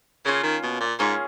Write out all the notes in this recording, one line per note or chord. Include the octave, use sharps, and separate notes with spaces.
C#3 A#3 C#4 F4
D#3
B2
A#2
G#2 A#3 C#4 F4 G#4